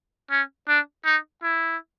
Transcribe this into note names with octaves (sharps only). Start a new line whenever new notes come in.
C#4
D4
D#4
E4